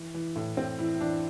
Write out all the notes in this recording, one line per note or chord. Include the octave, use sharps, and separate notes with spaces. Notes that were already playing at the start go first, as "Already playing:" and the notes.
Already playing: E3
E3
A2
A2 C4
E3 E4
E3 D4